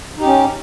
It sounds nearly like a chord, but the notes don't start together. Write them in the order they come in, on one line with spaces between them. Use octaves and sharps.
D#4 G4 C#4